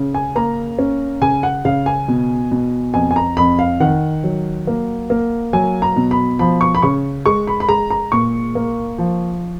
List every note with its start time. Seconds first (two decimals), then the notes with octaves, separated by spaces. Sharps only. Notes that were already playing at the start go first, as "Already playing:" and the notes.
Already playing: C#3
0.15 G#5
0.35 A#3 A#5
0.79 C#4
1.21 C#3 G#5
1.43 F#5
1.65 C#3 F5
1.86 G#5
2.08 B2
2.51 B2
2.94 F2 G#5
3.11 G#5
3.16 A#5
3.37 F2 B5
3.59 F5
3.80 D#3 F#5
4.24 F#3
4.67 A#3
5.10 A#3
5.53 F#3 G#5
5.82 A#5
5.96 B2
6.11 B5
6.39 F3 B5
6.61 C#6
6.75 B5
6.82 C#3 C#6
7.26 G#3 C#6
7.47 B5
7.60 B5
7.68 G#3 A#5
7.90 A#5
8.12 A#2 C#6
8.55 A#3
8.98 F3